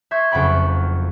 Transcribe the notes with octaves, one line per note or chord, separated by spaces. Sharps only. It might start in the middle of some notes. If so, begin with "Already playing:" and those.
E5 C6 C#6 G6 G#6
F#1 F2 F#5 G5 B5 C#6